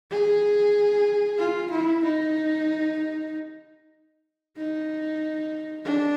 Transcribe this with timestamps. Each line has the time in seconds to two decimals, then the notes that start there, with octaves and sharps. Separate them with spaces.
0.11 G#4
1.38 F4
1.71 E4
2.03 D#4
4.57 D#4
5.85 D4